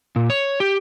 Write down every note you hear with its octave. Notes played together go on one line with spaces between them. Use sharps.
A#2
C#5
G4